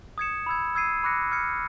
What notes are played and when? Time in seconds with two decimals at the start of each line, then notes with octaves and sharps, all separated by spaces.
0.18 D#6 G#6 C#7 E7
0.46 B5 E6 G#6
0.75 E6 G#6 C7 D#7
1.03 B5 D6 F#6 A#6 C#7
1.32 F6 G#6 C#7